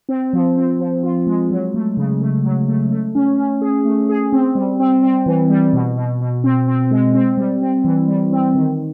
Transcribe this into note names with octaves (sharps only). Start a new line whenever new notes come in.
C4
F3
C4
F3
F4
G#3
F#3
A3
C#3
A3
F#3
A3
A3
C#4
C#4
G#4
A3
G#4
C4
G3
C4
C4
E3
G3
B2
B2
B2
C4
C4
G#3
C4
G3
C4
E3
G3
C4
D#3